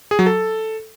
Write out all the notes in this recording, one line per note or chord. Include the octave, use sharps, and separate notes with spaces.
G#4
F#3
A4